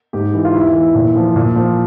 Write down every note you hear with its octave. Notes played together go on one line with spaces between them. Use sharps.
G#2 G4
E3
F4
E2 E4
E3
A#2
F3
A#2
F3